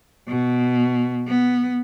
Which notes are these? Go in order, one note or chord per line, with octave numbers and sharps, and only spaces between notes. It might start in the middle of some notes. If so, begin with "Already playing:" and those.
B2
B3